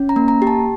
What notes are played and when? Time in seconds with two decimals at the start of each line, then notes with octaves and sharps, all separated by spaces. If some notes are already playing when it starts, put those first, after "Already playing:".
Already playing: C#4
0.09 A#5
0.16 A#3
0.28 A#5
0.42 G4
0.47 A5